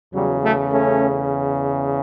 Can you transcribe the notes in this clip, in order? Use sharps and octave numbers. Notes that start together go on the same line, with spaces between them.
E2 C#3 F#3 G3
F#3 A3
A3 C#4